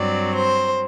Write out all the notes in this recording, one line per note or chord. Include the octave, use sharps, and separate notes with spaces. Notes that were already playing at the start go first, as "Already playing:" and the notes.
Already playing: G2 F#3 C4 D5
C5